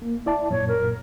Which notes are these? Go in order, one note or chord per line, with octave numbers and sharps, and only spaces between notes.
A#3
E4 D5 A5
F#2 A#2 C#5
A#4